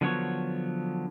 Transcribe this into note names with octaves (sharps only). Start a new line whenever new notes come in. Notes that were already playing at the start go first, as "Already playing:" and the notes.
D3 F3 F#3 B3 C#5